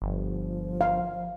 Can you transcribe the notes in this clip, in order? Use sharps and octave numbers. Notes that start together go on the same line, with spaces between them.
G1 F3
F5